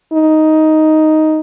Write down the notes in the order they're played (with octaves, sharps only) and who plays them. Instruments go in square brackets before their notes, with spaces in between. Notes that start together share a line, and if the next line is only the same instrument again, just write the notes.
[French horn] D#4